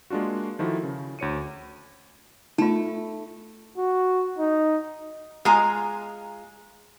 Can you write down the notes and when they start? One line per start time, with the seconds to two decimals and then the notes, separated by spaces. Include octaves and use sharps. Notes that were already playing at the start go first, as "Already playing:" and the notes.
0.10 G#3 A#3 D4 F4 F#4
0.59 D#3 F3 E4 F#4 A4
0.83 C#3
1.19 D2 C#5 C#7 D#7
2.58 A3 D#4 F4
3.77 F#4
4.38 D#4
5.45 G#3 F4 G#5 A#5